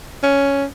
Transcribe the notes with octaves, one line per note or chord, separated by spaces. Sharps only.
C#4